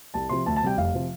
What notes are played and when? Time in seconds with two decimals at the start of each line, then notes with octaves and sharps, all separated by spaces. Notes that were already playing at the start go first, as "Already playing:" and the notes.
0.14 C2 A5
0.29 C3 F3 C6
0.46 D2 A5
0.56 A5
0.62 C3 G3 G5
0.77 F1 F5
0.94 C3 F3